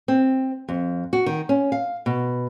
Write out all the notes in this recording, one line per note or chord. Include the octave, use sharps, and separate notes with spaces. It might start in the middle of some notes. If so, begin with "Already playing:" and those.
C4
F2
F#4
D#3
C#4
F5
B2